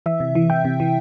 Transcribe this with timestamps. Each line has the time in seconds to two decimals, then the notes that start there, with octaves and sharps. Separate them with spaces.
0.06 E3 E5
0.20 C3
0.35 E3
0.50 E3 G5
0.65 C3
0.80 E3